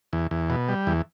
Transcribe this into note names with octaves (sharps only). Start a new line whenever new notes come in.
E2
E2
B2
G3
E2